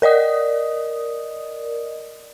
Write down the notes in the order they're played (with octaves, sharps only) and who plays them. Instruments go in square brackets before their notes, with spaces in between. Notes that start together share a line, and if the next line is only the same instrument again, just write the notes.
[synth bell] A#4 D5 D#5 D#6